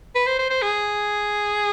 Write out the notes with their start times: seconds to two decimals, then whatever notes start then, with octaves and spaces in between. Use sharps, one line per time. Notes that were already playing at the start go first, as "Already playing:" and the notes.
0.15 B4
0.26 C5
0.39 C5
0.50 C5
0.62 G#4